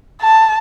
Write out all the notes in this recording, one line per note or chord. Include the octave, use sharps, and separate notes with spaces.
A5